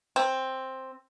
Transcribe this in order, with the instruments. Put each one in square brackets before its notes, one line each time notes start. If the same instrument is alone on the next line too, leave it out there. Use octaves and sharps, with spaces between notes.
[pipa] C4